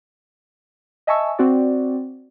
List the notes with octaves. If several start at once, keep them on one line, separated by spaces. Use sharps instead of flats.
D#5 E5 G#5 A5 C#6 E6
C4 F#4 D5